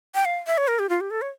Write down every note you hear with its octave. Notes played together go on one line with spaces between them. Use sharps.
G5
F5
E5
C#5
A#4
G4
F4
G4
A4
C#5